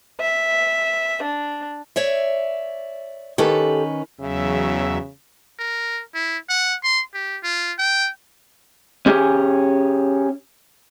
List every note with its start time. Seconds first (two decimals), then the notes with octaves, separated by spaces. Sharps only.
0.20 E5
1.22 D4
1.96 C#5 D5 E5
3.38 D#3 C#4 G4 A4 B4
4.20 E2 C#3 F#3 E5
5.59 A#4
6.14 E4
6.49 F#5
6.84 C6
7.14 G4
7.43 F4
7.79 G5
9.06 C#4 G4 G#4